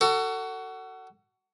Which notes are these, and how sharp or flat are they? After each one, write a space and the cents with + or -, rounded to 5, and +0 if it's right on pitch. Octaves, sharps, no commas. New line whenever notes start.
F#4 +20 A4 +30